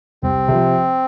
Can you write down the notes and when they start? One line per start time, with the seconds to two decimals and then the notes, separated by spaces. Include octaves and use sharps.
0.23 C2 C4
0.48 C3 F3